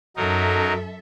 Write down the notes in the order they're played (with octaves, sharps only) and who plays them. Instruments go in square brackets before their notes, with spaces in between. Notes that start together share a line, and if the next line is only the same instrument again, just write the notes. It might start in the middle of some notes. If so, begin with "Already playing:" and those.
[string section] F#2 A4 E5 [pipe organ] F#3 D#4 A#4